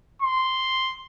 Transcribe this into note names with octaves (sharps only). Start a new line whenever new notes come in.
C6